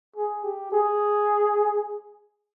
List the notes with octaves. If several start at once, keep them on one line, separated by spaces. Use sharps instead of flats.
G#4
G4
G#4